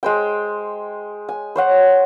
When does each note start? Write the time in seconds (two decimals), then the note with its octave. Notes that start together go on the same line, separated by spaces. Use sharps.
0.03 G#3 C5 G5
1.29 G#5
1.56 C5 C#5 F#5